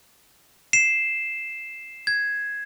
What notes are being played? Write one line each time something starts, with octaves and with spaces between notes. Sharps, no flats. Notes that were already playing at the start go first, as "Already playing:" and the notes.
C7 E7
G#6